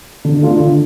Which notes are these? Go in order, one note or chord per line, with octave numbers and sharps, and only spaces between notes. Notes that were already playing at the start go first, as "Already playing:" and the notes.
D3
A3 D4 F4
D3